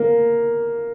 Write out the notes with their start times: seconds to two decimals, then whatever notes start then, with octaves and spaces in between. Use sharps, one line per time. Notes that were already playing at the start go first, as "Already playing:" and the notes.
Already playing: A#3